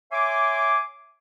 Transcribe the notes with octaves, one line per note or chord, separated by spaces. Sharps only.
C#5 E5 G#5 C6 D6